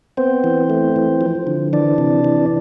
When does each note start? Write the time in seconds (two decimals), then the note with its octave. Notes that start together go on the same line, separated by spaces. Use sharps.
0.17 B3 C4 C5
0.44 E3
0.70 A3
0.96 E3
1.21 F3
1.47 D3
1.73 E3 D4 D5
1.98 C3
2.24 E3